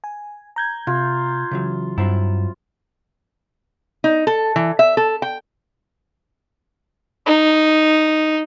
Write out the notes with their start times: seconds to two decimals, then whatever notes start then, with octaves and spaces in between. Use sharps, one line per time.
0.04 G#5
0.56 A#5 G6 G#6
0.87 C3 F4
1.51 C#3 E3 F#3
1.98 G2 F#3 C4 E4
4.04 D#4
4.27 A4
4.56 E3
4.79 E5
4.97 A4
5.22 G5
7.26 D#4